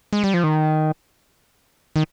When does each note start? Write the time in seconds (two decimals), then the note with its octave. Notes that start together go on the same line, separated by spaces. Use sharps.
0.13 G#3
0.24 G3
0.34 F3
0.44 D#3
1.96 D#3